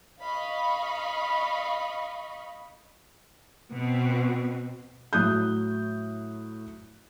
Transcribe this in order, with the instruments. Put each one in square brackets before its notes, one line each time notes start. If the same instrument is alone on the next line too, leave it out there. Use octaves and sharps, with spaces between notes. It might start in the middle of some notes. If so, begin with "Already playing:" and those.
[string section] D#5 F5 B5 C#6
[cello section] B2 C4
[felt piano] A2 F#3 D#6 F#6 G6